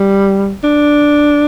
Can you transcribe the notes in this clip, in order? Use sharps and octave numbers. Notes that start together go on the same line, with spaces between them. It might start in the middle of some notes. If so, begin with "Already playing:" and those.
Already playing: G3
D4